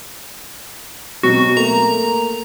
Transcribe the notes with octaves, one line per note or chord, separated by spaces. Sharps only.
B2 F#3 C4 F#4
A3 A#3 A#5